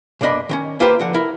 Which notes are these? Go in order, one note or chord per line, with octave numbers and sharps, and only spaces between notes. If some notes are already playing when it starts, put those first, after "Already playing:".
B1 F#2 A#3 D4 D#5 B5
D#3 C4 C#4
A#3 F4 G4 B4 C5
D3 F3 F#5
E4 A#4